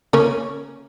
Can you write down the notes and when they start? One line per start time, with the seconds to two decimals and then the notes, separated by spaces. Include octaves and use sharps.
0.13 C#3 A#3 C#4 A#4 C#5